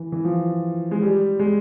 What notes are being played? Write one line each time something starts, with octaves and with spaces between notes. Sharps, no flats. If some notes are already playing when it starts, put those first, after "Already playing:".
Already playing: E3
E3
F3
G#3
G3
G#3